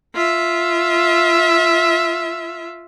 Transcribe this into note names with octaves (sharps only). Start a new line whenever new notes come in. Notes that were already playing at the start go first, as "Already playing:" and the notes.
F4 E5